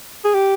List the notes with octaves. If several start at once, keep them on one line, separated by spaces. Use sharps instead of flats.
G#4
G4